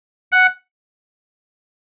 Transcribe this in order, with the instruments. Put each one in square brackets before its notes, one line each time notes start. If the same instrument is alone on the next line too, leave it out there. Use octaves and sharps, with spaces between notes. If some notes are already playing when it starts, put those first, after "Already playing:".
[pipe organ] F#5